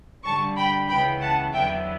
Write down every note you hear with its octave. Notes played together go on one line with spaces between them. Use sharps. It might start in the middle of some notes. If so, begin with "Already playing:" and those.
G2 D3 G3 A5 C#6
G5 B5
C#2 C#3 E3 B3 G5 B5
F#5 A5
E2 D3 F#3 B3 E4 E5 G5